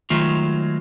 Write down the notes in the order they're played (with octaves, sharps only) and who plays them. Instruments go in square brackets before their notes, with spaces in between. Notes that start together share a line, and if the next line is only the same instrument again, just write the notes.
[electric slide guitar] D#3 F#3 G#3 A3 F4